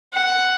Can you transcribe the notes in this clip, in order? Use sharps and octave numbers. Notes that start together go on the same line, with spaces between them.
F#5